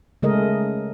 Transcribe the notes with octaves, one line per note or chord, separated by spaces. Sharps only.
C#3 G#3 A3 A#4 D#5